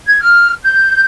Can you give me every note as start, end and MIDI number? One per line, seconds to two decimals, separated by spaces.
0.07 0.19 92
0.20 0.53 89
0.62 1.03 91